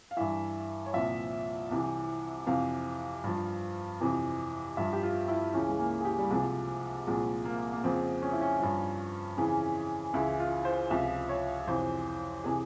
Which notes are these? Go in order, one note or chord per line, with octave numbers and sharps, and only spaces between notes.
F5
G2 E3 E5
C#5
C2 A#2 F3 E5
C2 C3 E3
F2 C3 E3 F5
G2 F3
F2 C3 E3
G2 F3 E5
G4
F4
E4
C#2 C#3 E3 C#4
G#3
A#3
G#4
G4
G3
C2 C3 F3 G#3
C2 A#2 F3 G#3
A#3
A#3
F2 C#3 F3 C4
C#4
E4
C#4
G2 F3
F2 C#3 E3
C#2 C#3 E3 E4
F4
C5
C#2 C3 F3 E5
C#5
F2 C3 E3 C5
C3 E3 G#4